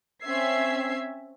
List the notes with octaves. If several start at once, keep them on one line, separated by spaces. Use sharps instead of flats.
C4 C#4 E5 E6 G#6 C7